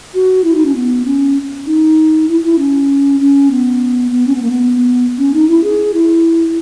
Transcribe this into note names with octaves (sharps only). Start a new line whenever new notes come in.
F#4
E4
D#4
C#4
B3
C#4
D#4
E4
E4
C#4
C#4
B3
B3
C#4
B3
A#3
B3
C#4
D#4
E4
G#4
E4